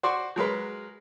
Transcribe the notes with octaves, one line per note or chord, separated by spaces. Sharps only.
F#4 C5 D5 C6 C#6
F#3 G#3 A#4 B4